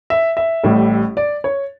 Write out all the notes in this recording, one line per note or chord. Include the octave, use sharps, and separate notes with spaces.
E5
E5
A1 A2 G3
D5
C#5